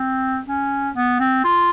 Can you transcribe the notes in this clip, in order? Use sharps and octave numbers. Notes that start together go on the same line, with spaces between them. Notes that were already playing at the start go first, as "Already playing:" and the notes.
Already playing: C4
C#4
B3
C4
F4